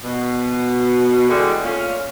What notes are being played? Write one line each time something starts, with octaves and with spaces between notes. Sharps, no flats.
B2
D3 E3 G3 G#3
A#2 A3 C#4 F5